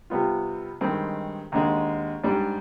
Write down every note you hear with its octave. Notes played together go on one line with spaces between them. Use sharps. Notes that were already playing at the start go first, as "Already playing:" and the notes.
C3 G3 B3 F4
G2 D#3 G#3 C4
D#2 D3 G#3
G#2 G3 D4